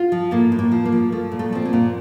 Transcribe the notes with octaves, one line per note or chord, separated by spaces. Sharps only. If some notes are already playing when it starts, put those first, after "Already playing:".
Already playing: F4
F3
A2 A#3
A2
A#3
F3
A#3
F3
F3 A3
A#2
A3
F3 C4
A#3
A#2